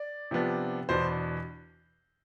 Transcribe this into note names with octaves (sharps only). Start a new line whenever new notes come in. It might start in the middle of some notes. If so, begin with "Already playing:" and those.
Already playing: D5
C3 F3 B3 D4
E2 B2 B3 D4 C5